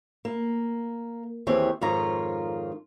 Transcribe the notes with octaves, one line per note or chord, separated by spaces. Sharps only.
A#3
D#2 E3 C4 G#4 C#5
F2 G#2 D#3 F4 C#5 A#5